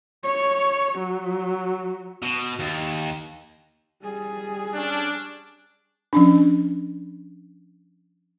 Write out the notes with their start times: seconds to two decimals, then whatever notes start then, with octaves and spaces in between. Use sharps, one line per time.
0.23 C#5
0.98 F#3
2.22 B2
2.59 D#2
4.03 G3 G#4
4.74 C#4 D4
6.13 F3 C#4 D4